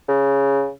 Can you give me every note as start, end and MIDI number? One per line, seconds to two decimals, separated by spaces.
0.08 0.69 49